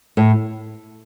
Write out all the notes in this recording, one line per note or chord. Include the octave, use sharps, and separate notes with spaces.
A2